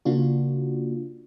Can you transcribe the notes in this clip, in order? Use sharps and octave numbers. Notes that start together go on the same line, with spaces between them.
C#3 A#3 D4 F4 F#4